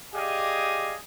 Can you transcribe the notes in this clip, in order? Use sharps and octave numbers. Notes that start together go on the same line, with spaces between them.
G4 G#4 D5 D#5 F5 G#5